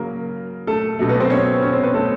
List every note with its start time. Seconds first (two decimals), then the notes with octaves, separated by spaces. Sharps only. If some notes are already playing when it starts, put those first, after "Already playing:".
Already playing: C#3 F#3 A#3 A#4
0.67 A3 A4
0.99 B2 F#3 A3
1.09 B3 B4
1.20 C4 C5
1.30 C#4 C#5
1.62 C#4 C#5
1.73 C4 C5
1.83 B3 B4
1.94 A3 A4